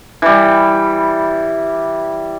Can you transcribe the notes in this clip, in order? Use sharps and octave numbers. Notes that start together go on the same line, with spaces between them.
E3 G3